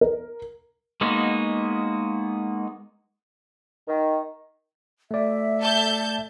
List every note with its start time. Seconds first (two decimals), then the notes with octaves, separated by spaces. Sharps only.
0.01 A#4
1.01 G#3 A#3 B3 D#4 F#4
3.87 D#3
5.11 A3 D5 E5
5.60 A4 A5 G6